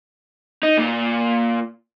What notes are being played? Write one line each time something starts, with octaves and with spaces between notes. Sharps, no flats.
D#4
A#2